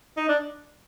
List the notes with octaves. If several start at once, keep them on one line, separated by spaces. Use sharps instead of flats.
D#4
D4